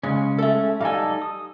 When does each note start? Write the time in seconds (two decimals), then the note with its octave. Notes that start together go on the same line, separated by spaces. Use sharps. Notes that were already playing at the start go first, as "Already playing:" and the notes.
0.03 C#3 G#3 C#4
0.39 A4 E5
0.81 G3 D#4 A4 F5 G#5
1.22 D#6